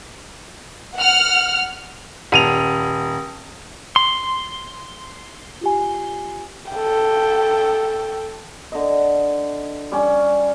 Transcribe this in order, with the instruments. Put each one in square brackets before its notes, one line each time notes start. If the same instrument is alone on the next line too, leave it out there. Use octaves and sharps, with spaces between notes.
[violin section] F#5 F6
[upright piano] D#1 D#7 F7
[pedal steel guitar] C6
[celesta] F4 G4 G#5
[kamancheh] A4 G5
[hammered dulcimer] D3 D#5
G3 C#4